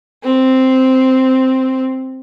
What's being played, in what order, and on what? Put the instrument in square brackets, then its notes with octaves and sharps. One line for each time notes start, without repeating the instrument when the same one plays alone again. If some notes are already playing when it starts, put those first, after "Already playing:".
[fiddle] C4